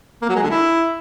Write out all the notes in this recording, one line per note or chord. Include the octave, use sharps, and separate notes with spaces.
A#3
F#3
G#3
D3
E4